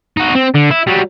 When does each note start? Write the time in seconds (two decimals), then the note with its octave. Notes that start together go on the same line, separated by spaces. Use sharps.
0.17 D#4 F#4
0.35 C4
0.54 D3
0.71 E4
0.87 F#3 G3